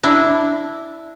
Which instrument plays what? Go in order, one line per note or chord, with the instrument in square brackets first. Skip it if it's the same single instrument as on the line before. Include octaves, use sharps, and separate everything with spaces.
[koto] D4 E4